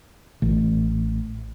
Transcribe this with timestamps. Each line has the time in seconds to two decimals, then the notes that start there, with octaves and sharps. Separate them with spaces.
0.42 A1